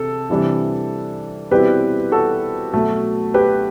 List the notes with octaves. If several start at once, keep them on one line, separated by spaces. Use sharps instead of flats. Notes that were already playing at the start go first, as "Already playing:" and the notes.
Already playing: C3 A4
C3 E3 G3 D4
B2 G3 C4 E4 G4 B4
F#4 A4
B2 F#3 A3
G4 B4